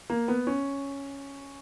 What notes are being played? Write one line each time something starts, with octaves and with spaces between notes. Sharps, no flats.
A#3
B3
C#4